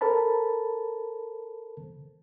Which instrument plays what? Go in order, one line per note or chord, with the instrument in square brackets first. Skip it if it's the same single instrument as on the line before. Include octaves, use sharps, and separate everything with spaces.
[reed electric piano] A4 A#4 C5 A5 B5